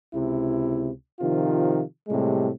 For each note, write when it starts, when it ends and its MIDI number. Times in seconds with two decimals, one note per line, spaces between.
0.14 0.90 37
0.14 0.90 48
0.14 0.90 64
1.20 1.81 48
1.20 1.81 51
1.20 1.81 53
1.20 1.81 65
2.08 2.50 45
2.08 2.50 48
2.08 2.50 55
2.08 2.50 56